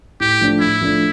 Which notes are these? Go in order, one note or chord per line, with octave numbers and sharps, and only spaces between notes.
A2 G4
F3 A3 D4
A2 E4
F3 A3 D4